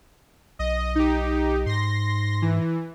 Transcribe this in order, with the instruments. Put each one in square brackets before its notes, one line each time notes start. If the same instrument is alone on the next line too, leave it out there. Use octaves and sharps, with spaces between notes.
[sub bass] B1 [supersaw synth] D#5
[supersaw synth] D#4 G4
[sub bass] G#2 [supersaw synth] C6 A#6
[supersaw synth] E3